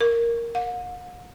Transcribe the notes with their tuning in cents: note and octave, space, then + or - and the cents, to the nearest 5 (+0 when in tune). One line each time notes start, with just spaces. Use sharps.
A#4 +0
F#5 -45